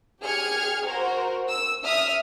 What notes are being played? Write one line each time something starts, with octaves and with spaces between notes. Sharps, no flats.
G4 G#4 F6 G#6 C#7
F#4 A#4 C5
E6
E5 D#6 F6